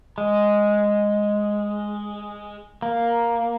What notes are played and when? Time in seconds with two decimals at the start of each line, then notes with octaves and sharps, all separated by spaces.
0.18 G#3
2.82 A#3